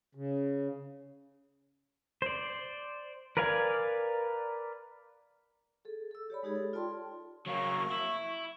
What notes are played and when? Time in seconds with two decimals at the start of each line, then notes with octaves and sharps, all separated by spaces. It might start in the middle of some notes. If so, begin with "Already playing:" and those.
0.15 C#3
2.22 C5 D5
3.37 A#4 B4 D5 F5 G#5
5.85 G#4 A4
6.11 A4 E6
6.30 G4 C#5 D5 B5
6.43 G#3 D#4 G4 G#4 C#5
6.55 A4
6.73 F4 D5 G5 A5 C6
7.47 F#3 A#3 C#6
7.92 E4